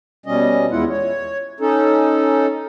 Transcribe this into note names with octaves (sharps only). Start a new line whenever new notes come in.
B2 G3 C#4 D#5
E2 G#3 E4 F4 F#5
C#5
C#4 D#4 A4